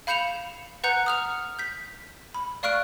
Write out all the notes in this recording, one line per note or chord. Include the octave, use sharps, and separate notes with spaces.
F5 B5 G6 C#7 E7 F7
B4 F#5 A#5 F#6 G6 C#7
D#6 F6 F7
G6 B6
B5
D5 F5 C#6 F6 F#6 D7